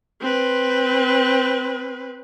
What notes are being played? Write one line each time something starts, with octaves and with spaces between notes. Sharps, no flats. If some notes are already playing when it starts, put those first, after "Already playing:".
C4 B4